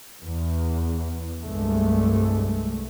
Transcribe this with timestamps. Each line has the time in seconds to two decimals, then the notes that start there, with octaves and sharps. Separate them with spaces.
0.23 E2
1.43 C2 G2 G#3 A3